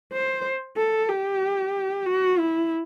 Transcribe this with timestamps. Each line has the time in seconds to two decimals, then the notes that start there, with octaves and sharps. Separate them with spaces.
0.13 C5
0.77 A4
1.09 G4
2.06 F#4
2.38 E4